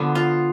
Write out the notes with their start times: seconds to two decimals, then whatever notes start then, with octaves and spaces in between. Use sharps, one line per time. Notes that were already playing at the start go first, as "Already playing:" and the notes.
Already playing: D3 F3 B3
0.15 F4